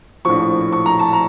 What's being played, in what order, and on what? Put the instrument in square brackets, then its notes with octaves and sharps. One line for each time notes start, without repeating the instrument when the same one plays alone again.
[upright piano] A#1 A2 F3 C#6
C#6
A#5
A5
A#5